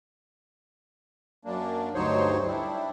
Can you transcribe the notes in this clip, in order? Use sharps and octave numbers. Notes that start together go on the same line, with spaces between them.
F#2 A#3 D4
D2 G2 F#3 D#4 C5 C#5
G3 D4 E4